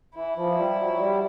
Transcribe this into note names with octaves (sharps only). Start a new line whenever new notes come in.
E3 E4
F3
G3
F#3
G3